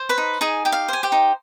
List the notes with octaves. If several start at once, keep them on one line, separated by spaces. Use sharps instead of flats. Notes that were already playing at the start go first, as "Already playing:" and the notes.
Already playing: C5
B4 B5
D#4
D#4 G#4 G#5
G4 G5
F5
C5 G#5
G4 G5
D#4